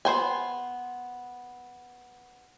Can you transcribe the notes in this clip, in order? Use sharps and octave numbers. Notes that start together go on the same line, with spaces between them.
B3 C5 G5 G#5